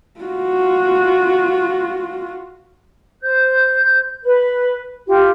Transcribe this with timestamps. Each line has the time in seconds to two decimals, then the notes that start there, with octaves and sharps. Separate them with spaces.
0.20 F4 F#4
3.21 C5 G6
4.23 B4
5.07 F4 G4